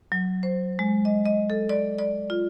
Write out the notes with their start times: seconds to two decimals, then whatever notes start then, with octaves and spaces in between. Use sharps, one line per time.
0.12 F#3
0.43 C5
0.79 G#3
1.05 D#5
1.25 D#5
1.50 A4
1.69 D5
1.99 D5
2.30 F4